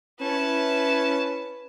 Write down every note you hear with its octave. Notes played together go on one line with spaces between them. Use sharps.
C#4 E4 B4 A5